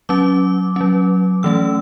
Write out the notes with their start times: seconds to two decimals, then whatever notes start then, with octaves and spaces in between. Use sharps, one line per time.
0.09 F#3 C#4 D6
0.76 F#3 C#4
1.43 E3 A3 C#4 E6